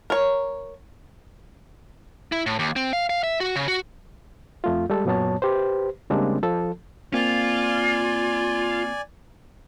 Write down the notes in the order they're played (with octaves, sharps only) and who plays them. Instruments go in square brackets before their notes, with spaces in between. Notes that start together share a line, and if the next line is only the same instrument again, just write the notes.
[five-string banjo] A#4 C#5
[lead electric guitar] E4
A2
D#2
C4
F5
F5
E5
F#4
C#3
F#4
[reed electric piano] F2 A3 F4
G3 G#3 A4
F#2 A#2 F#3 B3 C#5 A5
G4 B4 C5
C#3 G3 G#3 A#3 C4 D4
F3 A4
[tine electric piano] A#3 C4 [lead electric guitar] F4 [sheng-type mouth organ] D5 G#5